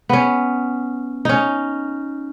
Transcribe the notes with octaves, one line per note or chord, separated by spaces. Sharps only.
B3 C#4
C#4 D#4